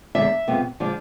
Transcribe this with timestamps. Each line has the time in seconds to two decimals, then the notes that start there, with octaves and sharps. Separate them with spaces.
0.15 E2 D3 G#3 D4 E5
0.48 F2 C3 G#3 B3
0.80 D3 F3 G#3 D4